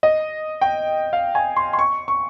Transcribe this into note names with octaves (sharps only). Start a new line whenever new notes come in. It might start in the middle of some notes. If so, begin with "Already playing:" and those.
D#5
G5
F5
G#5
C6
C6
C#6
C#6